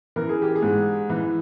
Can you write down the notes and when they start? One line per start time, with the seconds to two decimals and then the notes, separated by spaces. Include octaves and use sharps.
0.16 E3 A#4
0.29 G#4
0.42 G4
0.55 G#4
0.62 G#2
1.10 E3